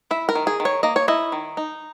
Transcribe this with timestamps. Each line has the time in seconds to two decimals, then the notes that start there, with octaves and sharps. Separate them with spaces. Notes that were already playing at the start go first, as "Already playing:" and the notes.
0.11 E4 E5
0.29 A#4
0.35 D#3
0.47 G#4
0.60 D#3
0.65 C#5
0.83 A#3 D#5
0.96 C#5
1.08 E4 D#5
1.32 D#3
1.57 D#4